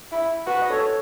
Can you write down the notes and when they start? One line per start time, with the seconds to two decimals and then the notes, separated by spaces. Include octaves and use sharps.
0.12 E4
0.46 F#4 B4
0.62 D#5
0.70 A4 C#5
0.86 C#5